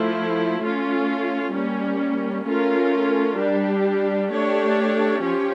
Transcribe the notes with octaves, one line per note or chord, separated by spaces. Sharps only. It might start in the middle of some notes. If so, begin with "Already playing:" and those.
Already playing: F3 A3 E4
A3 C#4 F4
G3 A#3 C#4
A3 C#4 F4 A#4
G3 D4 G4
A3 D4 G4 C#5
F3 C#4 G4 C#5